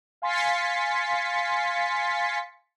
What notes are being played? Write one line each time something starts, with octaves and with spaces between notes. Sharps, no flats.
F5 G#5 C6 A6 B6 C#7